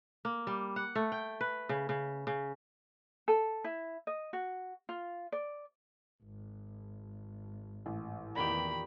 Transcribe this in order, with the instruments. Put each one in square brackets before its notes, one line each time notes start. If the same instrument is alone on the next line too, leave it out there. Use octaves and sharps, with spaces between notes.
[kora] A#3
G3
F#5
A3
G5
B4
C#3
C#3
C#3
[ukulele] A4
E4
D#5
F#4
F4
D5
[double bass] G#1
[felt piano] A1
[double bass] E2 [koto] A#2 D#3 G4 [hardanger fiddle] B5